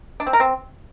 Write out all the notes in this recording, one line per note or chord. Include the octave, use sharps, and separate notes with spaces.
D4
C4
A#4
C4